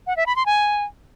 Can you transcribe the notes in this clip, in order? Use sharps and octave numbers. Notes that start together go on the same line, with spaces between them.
F#5
E5
B5
C6
G#5